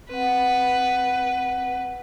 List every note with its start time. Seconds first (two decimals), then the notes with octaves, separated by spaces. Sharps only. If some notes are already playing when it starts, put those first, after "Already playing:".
0.10 C4 B4 F#5